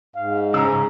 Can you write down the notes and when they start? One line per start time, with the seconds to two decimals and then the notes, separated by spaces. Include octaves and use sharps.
0.16 G#2 F5
0.54 C#3 G#4 A#5 E6